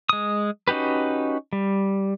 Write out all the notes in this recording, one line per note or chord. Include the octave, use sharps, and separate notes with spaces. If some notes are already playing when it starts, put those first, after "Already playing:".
G#3 D#6
C#4 D#4 F#4 G4 B4
G3